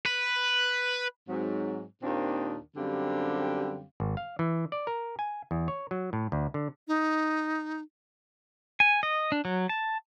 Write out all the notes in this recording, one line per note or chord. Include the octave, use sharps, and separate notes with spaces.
B4
G#2 F#3 C4
D#2 A#2 D#3 C4 D4 F4
F#2 D3 G3 C4 G4 F5
G#1
F5
E3
D5
A#4
G#5
E2
C#5
F#3
A2
D2
D3
D#4
G#5
D#5
D4
F#3
A5